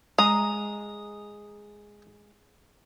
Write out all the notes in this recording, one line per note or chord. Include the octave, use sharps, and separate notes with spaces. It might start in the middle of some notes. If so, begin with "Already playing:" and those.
G#3 A#5 D#6